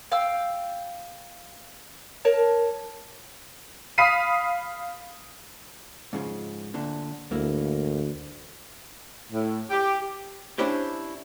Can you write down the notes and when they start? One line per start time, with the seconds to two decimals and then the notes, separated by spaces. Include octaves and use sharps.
0.12 F5 G5 E6
2.25 A#4 C#5 A5
3.98 F5 B5 D#6 B6 C7 D#7
6.13 G#2 C#3 F3
6.74 D2 A#2 D3
7.31 D2 G#2 A#3 E4
9.30 A2
9.70 G4
10.58 C#4 D4 E4 G4 C5